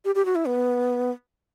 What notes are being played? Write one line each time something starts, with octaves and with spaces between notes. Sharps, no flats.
G4
G4
F#4
E4
B3